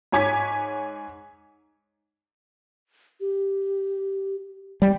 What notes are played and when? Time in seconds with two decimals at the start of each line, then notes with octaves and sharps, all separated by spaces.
0.12 G#2 C#5 G#5 D6 G#6 B6
3.20 G4
4.82 G3